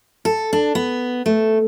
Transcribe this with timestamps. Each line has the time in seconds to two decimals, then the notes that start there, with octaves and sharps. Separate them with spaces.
0.25 A4
0.53 D4
0.75 B3
1.26 A3